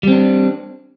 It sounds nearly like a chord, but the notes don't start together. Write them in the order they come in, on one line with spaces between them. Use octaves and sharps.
G3 C4 D4